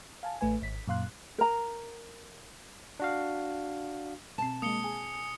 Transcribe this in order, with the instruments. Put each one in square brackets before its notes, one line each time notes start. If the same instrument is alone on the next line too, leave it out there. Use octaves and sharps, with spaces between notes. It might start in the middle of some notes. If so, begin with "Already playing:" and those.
[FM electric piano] F5 G#5 A5
A1 A3 B4 G#5
G#1 B6
F#2 A#2 F5 C6 F#6
[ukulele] A#4 A#5
[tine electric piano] D4 F#4 F5
[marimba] B2 C4 [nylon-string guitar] A5
[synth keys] G#3 A#3 [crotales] D#6 C#7 G7
[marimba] G#4 [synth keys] G#5